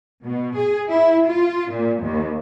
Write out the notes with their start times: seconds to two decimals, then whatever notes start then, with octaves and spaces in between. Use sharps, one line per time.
0.23 B2
0.56 G#4
0.89 E4
1.27 F4
1.71 A#2
2.03 D#2